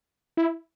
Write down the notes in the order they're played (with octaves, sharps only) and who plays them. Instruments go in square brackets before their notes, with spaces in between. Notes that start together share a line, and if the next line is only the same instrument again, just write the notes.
[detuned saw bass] E4